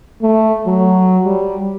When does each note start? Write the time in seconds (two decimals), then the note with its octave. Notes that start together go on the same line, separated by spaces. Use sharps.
0.22 A3
0.67 F#3
1.25 G3